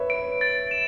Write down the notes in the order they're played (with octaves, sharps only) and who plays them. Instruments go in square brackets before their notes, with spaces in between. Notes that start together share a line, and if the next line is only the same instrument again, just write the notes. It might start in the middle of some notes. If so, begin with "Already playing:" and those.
Already playing: [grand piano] B4 C#5 E5
[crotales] D7
A6
E7